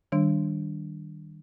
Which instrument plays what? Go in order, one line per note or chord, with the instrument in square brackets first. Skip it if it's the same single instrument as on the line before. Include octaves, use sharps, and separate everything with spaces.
[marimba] D#3 G3 D4